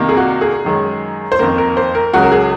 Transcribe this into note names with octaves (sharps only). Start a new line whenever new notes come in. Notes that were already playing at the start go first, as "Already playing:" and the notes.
Already playing: C2 C3 D#3 A#3
G#4
F#4
G#4
F#2 D#3 G#3
C5
F2 D#3 A#3 A#4
A#4
C5
A#4
C#2 C#3 F#3 F#4
A#4
G#4